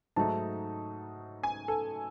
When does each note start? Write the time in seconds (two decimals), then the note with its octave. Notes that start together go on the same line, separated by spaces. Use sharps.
0.16 G#2 F#3 A3 D#4 A5
1.43 G#5
1.68 A4